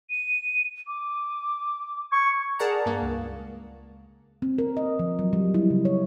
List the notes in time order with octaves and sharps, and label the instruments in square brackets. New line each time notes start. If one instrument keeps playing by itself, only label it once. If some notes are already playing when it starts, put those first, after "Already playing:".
[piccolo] D#7
D6
[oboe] C#6 [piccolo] G#6
[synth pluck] G#4 A#4 D5 F#5 A5 A#5
G2 A#3
C#2
[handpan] C4
A#4
D#5
F3
F#3
G3
E4
C#3
C#5